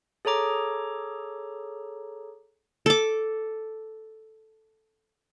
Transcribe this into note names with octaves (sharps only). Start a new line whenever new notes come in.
G#4 A4 C#5 A#5 D6
A4 D6